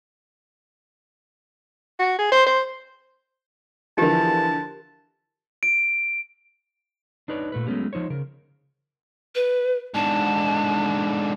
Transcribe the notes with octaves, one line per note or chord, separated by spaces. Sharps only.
F#4
G#4
C5
C5
D3 E3 F3 G4 A#4 A5
D7
D4 D#4 B4 C#5 D5
A#2 A3 B4
F#3 G#3 A3 B3 C#4 G4
F3 D#4 C5 C#5
C#3 A#4
B4
G#2 D3 A5